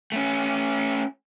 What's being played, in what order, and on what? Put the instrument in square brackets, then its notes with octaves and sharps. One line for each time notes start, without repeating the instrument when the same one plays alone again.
[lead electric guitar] A3 C#4